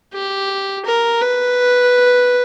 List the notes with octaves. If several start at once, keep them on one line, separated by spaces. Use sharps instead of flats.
G4
A#4
B4